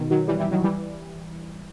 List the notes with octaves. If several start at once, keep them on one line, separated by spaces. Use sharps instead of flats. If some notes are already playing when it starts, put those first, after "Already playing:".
Already playing: B2 D#3
D#3 F#3
E3 G3
E3 G3
D#3 F#3
E3 G3